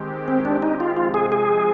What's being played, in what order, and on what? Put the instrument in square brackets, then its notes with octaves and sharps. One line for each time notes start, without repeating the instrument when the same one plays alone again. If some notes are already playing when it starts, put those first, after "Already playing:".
Already playing: [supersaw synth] D#3 G#3 C4 G4
[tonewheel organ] C4
D4
D#4
F4
[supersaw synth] C3 F3 G#3 C4 [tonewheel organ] F4
[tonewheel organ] G#4
G#4